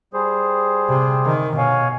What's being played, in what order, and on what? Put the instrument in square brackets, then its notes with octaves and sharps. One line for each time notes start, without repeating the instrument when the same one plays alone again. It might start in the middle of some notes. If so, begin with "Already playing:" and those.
[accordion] G3 G#4 C5
[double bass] C3
D#3
[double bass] B2 [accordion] C#5 F5 G#5